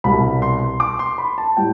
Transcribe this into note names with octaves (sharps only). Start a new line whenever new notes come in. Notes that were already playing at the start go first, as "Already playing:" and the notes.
C2 B2 G3 B5
C6
D6
C6
B5
A5
A2 G3 G5